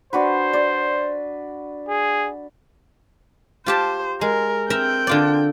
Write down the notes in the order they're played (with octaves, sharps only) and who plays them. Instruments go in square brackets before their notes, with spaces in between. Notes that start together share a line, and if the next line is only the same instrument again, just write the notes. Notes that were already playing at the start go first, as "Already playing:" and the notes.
[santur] D4 F#4 B4 [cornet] C5
[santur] D5
[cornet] G#4
[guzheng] F4 G4 A5 [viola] C5
[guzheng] G#3 [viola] A#4
[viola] C4 G5 [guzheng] A#4 E5 A#5
[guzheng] D3 F4 D5